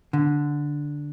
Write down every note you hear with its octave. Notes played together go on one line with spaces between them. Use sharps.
D3